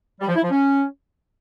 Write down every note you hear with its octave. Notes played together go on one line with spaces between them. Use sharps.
G3
F3
E4
F3
C#4